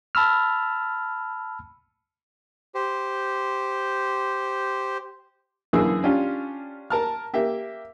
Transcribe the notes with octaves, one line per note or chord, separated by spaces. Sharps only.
A5 B5 E6 F6
G4 C5
F#2 D3 E3 A#3 G#4 E6
C#4 D4 F4 G4
A#4 A5 F6
A#3 G4 E5